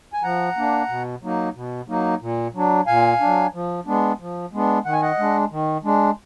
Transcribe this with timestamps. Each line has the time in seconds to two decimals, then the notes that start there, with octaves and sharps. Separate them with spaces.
0.13 G#5
0.23 F3 F#5 A#5
0.57 A#3 D4
0.89 B2
1.23 F#3 A#3 D#4
1.55 B2
1.88 F#3 A#3 D#4
2.21 A#2
2.54 F#3 D4
2.87 A#2 F5 G#5
3.20 F#3 D4
3.54 F3
3.86 G#3 B3 D4
4.20 F3
4.53 G#3 B3 D4
4.85 D#3 F#5
4.93 G#5
5.02 D#5 F#5
5.18 G#3 D4
5.51 D#3
5.84 G#3 D4